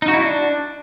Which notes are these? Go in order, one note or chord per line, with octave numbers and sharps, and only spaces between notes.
D#4
F#4
E4
D4